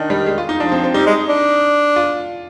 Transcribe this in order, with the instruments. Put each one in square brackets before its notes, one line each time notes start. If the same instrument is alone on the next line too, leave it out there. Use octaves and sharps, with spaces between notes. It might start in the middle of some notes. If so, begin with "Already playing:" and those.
Already playing: [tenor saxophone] D#3 [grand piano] D4 D#4
[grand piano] G3
G#3
F4
D#4
[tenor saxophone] F3 [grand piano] D4
[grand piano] C4
C4
[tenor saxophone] G3 [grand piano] D#4
[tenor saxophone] G#3
D4
[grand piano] F4